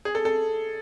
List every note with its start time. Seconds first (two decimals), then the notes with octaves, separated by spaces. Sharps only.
0.05 G#4
0.15 A4
0.25 A4